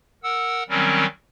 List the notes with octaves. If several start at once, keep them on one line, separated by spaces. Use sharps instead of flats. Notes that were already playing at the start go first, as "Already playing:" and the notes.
A#4 F#5 E6
D#3 F#3 G3 C4 C#4 A#4